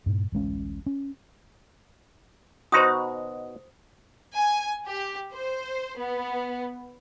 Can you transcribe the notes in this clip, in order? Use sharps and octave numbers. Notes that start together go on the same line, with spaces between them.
G2 A#2
D1 A1 G#3 C#4
C#4
B2 D#4 F#4 C5 C6 D#6
G#5
G4
C5
B3